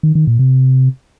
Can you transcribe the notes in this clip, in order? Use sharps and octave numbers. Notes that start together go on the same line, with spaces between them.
D#3
D#3
A#2
C3